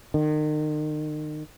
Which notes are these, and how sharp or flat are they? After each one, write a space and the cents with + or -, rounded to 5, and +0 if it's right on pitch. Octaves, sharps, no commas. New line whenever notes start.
D#3 -35